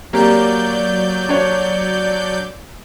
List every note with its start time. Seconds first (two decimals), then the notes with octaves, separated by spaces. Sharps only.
0.13 F#3 A#3 G4 D5 G6
1.29 D4 C#5